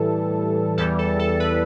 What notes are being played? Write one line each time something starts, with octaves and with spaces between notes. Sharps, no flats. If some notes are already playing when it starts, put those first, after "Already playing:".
Already playing: A2 E3 G3 A4
E2 E3 G3 A4
A4
A4
B4